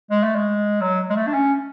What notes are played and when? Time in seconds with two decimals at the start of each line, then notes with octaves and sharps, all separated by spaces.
0.11 G#3
0.23 A3
0.35 G#3
0.81 F#3
1.10 G#3
1.16 A3
1.27 D4
1.34 C#4